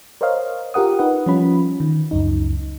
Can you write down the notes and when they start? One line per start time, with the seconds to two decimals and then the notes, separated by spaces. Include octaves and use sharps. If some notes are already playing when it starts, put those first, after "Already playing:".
0.21 A#4 C5 C#5 D#5 F5
0.74 F4 G4 A#4 F#5 D#6
0.99 D#4 B4 F#5
1.26 F3 G3 C#4 F4 B5
1.80 D#3
2.11 C#2 F#2 D#4